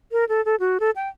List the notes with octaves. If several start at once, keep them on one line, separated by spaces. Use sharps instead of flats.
A#4
A4
A4
F#4
A4
G5